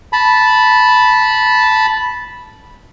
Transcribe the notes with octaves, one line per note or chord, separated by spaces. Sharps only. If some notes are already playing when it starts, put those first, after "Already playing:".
A5 B5